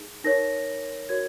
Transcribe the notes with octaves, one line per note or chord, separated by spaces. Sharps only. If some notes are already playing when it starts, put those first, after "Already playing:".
Already playing: D#4 G#4
D#4 A#4 C#5 A#6
F#4 A#4 C#5 G#6